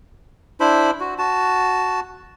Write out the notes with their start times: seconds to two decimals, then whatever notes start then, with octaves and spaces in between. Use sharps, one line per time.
0.60 D4 E4 C5 B5
1.00 F#4
1.18 F#4 A5